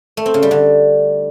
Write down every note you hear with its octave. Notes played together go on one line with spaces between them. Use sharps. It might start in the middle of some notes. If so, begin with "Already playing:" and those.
A3
C4
C#3
G3
D3